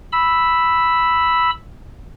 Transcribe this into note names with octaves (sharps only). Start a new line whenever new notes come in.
B5 E6